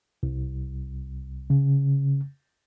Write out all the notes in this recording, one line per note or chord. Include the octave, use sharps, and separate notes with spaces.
C2
C#3